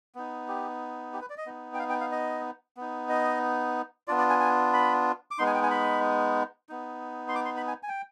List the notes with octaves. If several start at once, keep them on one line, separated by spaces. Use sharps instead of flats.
B3 D#4
G4
G4
B4
D5
D#5
B3 D#4
G5
F5
G5
F5
D#5
B3 D#4
D#5
B3 D4 F4 D5
D5
G#5
G#5
B5
D6
G#3 B3 D#4 C6
G#5
G5
G#5
B5
B3 D#4
C6
D6
C6
B5
G#5
G#5
G5